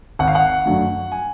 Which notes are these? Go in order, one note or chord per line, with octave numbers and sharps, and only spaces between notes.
G#1 F#5
F5
F#5
F#2 D3 F#3 A3
G#5